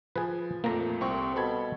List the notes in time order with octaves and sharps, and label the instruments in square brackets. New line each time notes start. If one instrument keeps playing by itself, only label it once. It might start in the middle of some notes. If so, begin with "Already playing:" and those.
[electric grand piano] F3 [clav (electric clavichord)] G#4 B4
[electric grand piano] F2 A#2 A3 [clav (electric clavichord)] A#3 A#5
[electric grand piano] C2 C#6 [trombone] C4
[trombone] B2 [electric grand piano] A4 B5 G#6